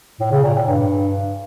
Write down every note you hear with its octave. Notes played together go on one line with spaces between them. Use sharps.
A2
C#3
A#2
A2
G2